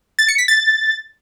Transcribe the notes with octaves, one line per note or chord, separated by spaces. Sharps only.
A6
C#7
B6
A6